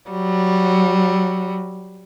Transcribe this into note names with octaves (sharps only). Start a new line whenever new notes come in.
F#3 G3